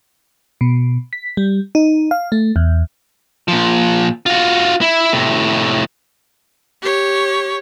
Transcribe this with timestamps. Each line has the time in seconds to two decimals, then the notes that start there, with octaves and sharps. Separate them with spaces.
0.61 B2
1.13 B6
1.37 G3
1.75 D#4
2.11 F5
2.32 A3
2.56 E2
3.48 A#2 F3
4.26 F4 F#4
4.81 E4
5.13 A2 C3
6.82 G4 C#5